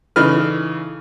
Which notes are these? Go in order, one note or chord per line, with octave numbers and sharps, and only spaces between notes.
C#3 E3 D#4 A4 B4 F6